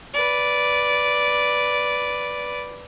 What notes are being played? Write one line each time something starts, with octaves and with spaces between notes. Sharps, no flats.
B4 D5